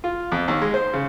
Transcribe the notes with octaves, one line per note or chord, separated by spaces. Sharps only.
F4
F2
D#2
G#3
C5
C#3